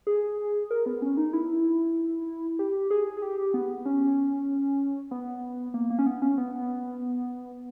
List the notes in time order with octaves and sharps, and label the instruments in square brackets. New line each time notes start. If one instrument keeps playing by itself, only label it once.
[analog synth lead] G#4
A#4
B3
C#4
D#4
E4
G4
G#4
G#4
G4
B3
C#4
B3
A#3
A#3
C#4
B3
C#4
B3